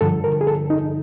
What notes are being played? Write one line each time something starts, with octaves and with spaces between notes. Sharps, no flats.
G2 D3 F3 A4
A#4
G#4
A4
D#4